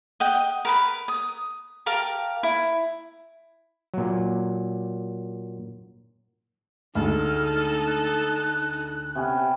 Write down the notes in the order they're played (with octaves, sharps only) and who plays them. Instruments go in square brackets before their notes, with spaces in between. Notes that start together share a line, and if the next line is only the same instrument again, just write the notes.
[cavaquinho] D#5 F#5 G5
A#4 B4 B5
D#6
G4 A#4 F5 A5
E4
[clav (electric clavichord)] A#2 F#3
[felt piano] D2 G#3 [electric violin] D#4 A4 [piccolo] F6
[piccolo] F#6
[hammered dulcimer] C3 B3 C#4